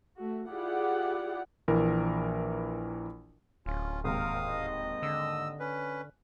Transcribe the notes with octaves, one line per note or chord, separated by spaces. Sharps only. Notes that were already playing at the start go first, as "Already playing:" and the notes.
A3 F#4
E4 F4 G4 G#4 D5 F#5
A#1 E3 A#4
D1 C#4 F4
G#1 D#2 A#4 F5 D#6
D#5
D3 E6
C#4 B4